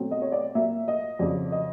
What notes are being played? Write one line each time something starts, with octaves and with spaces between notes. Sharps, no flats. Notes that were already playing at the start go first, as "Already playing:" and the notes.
Already playing: B2 F#3 A3 C4
D#5
C#5
D5
A#2 F#3 A#3 E5
D#5
F2 C#3 F#3 D5
D#5